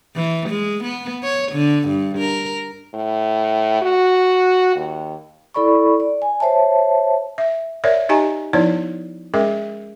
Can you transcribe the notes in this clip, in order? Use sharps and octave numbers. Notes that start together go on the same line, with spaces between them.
E3
G#3
B3
C#5
D3
G2
A#4
A2
F#4
D#2
E4 A4 D5 B5 C#6
D5
G#5
C5 C#5 E5 A5
E5
A#4 C#5 D5 E5
D#4 G4 D#5 G#5 A#5
F3 B3 D#4 E4 C#5 D5
G#3 C#4 G#4 A#4 E5